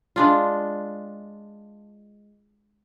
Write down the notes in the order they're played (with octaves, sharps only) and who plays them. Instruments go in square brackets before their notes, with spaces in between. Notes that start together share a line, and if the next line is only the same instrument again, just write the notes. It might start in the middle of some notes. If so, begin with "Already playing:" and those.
[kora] G#3 D4 F4